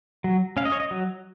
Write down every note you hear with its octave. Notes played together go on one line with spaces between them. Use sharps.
F#3
C#4 F5
D#5
C#5
D#5
F#3